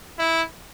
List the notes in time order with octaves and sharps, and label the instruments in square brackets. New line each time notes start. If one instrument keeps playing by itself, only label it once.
[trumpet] E4